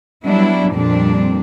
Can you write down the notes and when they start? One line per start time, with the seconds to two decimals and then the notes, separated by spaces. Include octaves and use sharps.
0.25 F#3 G3 B3 D4 E4
0.72 F2 A#2 G3 C4 D4